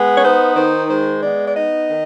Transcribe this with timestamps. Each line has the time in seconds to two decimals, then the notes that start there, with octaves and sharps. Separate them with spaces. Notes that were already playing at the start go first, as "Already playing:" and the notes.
Already playing: G#3 B3
0.17 C#5
0.23 D#4 C5
0.56 D#3 C5
0.89 G#3 C5
1.23 B3 D5
1.48 D5
1.56 D#4 D#5
1.89 D#3